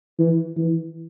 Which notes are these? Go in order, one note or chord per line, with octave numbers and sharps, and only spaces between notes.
E3
E3